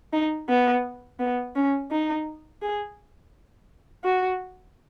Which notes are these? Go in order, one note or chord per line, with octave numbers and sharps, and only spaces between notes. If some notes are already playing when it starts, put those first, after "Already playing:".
D#4
B3
B3
C#4
D#4
G#4
F#4